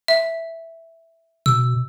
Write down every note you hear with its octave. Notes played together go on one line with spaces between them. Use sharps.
E5
B2 E6